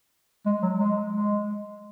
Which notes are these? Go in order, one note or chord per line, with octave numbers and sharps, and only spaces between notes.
G#3
F#3
G#3
G#3